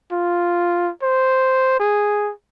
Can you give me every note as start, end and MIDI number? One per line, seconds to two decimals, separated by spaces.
0.12 0.91 65
1.03 1.77 72
1.80 2.32 68